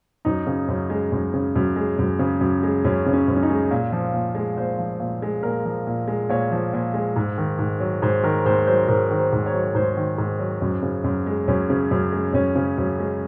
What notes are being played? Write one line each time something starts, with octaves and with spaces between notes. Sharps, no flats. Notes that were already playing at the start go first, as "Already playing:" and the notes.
F#2 D#4
C#3
F#2
G#3
F#2
C#3
F#2
G#3
F#2
C#3
F#2
G#3
F#2 C#4
C#3
C#4
F#2
C#4
D#4
G#3
A#2
F3
A#2
G#3
A#2 C5
F3
A#2
G#3
A#2 A#4
F3
A#2
G#3
A#2 C#5
F3
A#2
G#3
G#2
D#3
G#2
F#3
G#2 C5
D#3 A#4
G#2 C5
F#3 C5
G#2 A#4
D#3
C5
G#2
C#5
F#3
G#2 C5
D#3
G#2
F#3
F#2
C#3
F#2
G#3
F#2 C#4
C#3
F#2
G#3
F#2 C#4
C#3
F#2
G#3